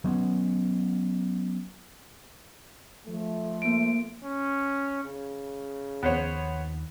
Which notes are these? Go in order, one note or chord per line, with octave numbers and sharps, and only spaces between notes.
F#3 B3 C#4
F3 A3
A#3 D7
C#4
C#3
D#2 F3 B3 C5 C#5